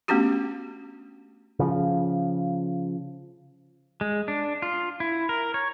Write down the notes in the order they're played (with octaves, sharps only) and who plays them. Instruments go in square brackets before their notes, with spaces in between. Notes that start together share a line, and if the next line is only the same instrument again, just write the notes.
[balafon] A3 B3 C#4 D4 F#4 G4
[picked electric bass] C#3 F3
[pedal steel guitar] G#3
D4
F4
E4
A#4
C#5